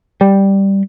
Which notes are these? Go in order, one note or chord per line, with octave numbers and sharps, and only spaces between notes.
G3